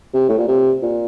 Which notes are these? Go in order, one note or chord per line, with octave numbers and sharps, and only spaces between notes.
C3
A2
A#2
C3
A#2